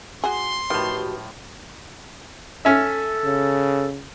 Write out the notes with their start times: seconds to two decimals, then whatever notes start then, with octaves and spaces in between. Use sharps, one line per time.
0.24 F#4 G#4 C6
0.70 A2 D#3 F3 F#4 G4 B4
2.65 C#4 A4 E5
3.25 C#3